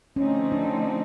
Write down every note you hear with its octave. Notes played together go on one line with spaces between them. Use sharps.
D3 F3 A3 C4 C#4 D#4
D4